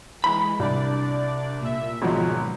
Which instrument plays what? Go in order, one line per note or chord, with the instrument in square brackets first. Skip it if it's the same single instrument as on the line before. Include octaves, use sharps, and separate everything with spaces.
[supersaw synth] E3 G#3 [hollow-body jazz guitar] B5
[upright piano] C2 [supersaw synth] D4 D5
[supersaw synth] A#2 E5
[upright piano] G#1 F3 F#3 [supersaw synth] B2 G#3